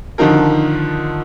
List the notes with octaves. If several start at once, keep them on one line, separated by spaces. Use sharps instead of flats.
D3 D#3 F3 D#4 F4 A#4